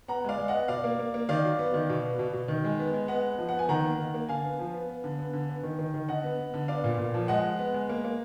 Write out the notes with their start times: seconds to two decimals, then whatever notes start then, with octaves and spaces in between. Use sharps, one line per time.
0.08 B3 F#5 A#5
0.24 G#3 D5 F5
0.38 G#3
0.48 D#5 F#5
0.54 B3
0.68 B2 D5 F5
0.84 A#3
0.99 A#3
1.14 A#3
1.29 D#3 D5 F5
1.44 F#3
1.59 B3
1.74 D#3
1.89 B2
2.04 B3
2.19 B2
2.33 B2
2.48 D#3
2.64 G#3
2.79 B3
2.94 G#3
3.08 B3 D#5 F#5
3.23 B3
3.38 F3
3.49 F#5
3.54 B3
3.59 G#5
3.69 D#3 F#5 A#5
3.84 A#3
3.98 D#3
4.14 A#3
4.29 D3 F5 G#5
4.44 B3
4.59 F3
4.74 B3
4.89 B3
5.04 D3
5.18 B3
5.33 D3
5.49 B3
5.63 D#3
5.79 D#3
5.94 D#3
6.09 D3 D#5 F#5
6.24 B3
6.39 B3
6.54 D3
6.68 B3 D5 F5
6.84 A#2
6.98 A#2
7.14 F3
7.28 G#3 D#5 F#5
7.44 G#3
7.59 B3
7.74 G#3
7.89 A#3
8.04 A#3